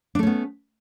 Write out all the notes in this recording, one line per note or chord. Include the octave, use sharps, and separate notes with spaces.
A3 B3 C#4 D4